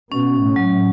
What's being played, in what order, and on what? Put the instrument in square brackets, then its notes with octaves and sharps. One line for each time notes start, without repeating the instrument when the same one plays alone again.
[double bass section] B2 [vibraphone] C#4
[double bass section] A2
[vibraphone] F#3